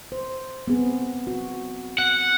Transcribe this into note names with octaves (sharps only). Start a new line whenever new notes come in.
C5
B3 C4 G#4
F#4
F#5